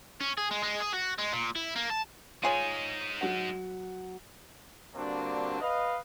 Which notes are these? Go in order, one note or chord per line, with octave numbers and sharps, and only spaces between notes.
C#4
G#4
G#3
G#3
G#4
F#4
G#3
A#2
E4
A#3
A5
G#3 D#4 F4 G#4 C#5
F#3 F#5
G2 D3 A#3 C4 D4 F#4
B4 D#5 F5